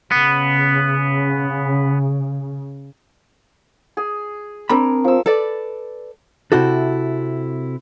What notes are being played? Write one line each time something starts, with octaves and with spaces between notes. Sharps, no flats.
C#3 B3
G#4
C4 D4 A#4 B5
F3 E6
A4 B4 D5
C3 C4 E4 F#4 A4